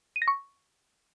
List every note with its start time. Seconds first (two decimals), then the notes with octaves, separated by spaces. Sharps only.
0.16 D#7
0.22 A#6
0.28 C#6